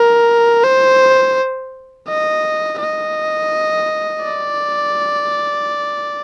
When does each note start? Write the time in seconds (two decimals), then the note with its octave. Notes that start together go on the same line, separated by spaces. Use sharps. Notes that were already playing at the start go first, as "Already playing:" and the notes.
Already playing: A#4
0.64 C5
2.08 D#5
2.80 D#5
4.24 D5